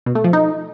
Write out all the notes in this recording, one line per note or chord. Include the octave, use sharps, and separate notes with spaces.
B2
A3
F3
D#4